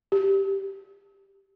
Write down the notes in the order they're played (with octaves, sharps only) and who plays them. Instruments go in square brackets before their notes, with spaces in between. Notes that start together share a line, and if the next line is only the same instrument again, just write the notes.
[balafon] G4